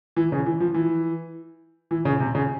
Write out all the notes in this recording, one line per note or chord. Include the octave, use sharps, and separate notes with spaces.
E3
C#3
E3
F3
E3
E3
C#3
C3
C#3